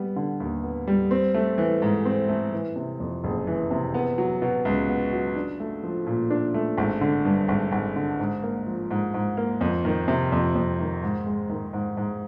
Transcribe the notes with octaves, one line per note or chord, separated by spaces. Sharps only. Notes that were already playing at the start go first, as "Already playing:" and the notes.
Already playing: G3 B3
D3
D#2
B3
G3
C4
A3
E3
G#2
C4
A3
E3
C3
F2
F#1
E3
C3
B3
F#3
B2
C#2
B3
F#3
D4
A3
F3
A#2
D4
A3
G#1
D3
G2
G#1
G#1
D3
G#2
A#3
F3
G#2
G#2
A#3
F2
D#3
C3
F2
F2
D#3
G#2
G#3
D#3
G#2
G#2